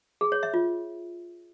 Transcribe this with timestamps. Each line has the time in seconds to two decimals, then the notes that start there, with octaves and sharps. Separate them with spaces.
0.21 G#4
0.32 C#5
0.43 E5
0.54 F4